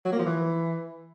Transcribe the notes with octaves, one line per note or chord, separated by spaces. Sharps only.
F#3
A#3
F3
E3